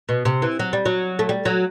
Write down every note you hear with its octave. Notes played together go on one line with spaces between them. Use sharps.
B2
C3
E3
F#3
G3
F#3
A3
G3
F#3